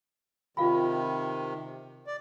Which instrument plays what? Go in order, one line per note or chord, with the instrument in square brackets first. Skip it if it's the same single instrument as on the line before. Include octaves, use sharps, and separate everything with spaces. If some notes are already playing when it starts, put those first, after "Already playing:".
[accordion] C3 D#3 [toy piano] F4 F5 B5
[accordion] D5